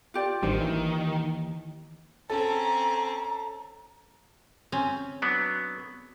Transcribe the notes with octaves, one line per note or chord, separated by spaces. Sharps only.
F4 G4 D5
A1 D#3 G3 D4 C5
D#2 E3
C4 C#4 A4 A#5
C4 C#4
F#3 B3 D4